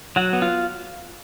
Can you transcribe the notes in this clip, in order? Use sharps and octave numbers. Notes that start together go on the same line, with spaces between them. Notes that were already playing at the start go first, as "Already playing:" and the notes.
F#3 F#4
B3
F4